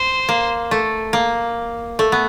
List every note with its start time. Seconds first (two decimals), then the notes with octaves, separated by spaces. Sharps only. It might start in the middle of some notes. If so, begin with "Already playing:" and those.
Already playing: C5
0.29 A#3
0.71 A3
1.13 A#3
1.99 A3
2.12 B3